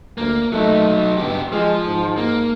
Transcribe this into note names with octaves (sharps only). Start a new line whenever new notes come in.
D2 A#3
F#3 A3 D#4
G2 B3 G4
F3 G#3
G#2
A#3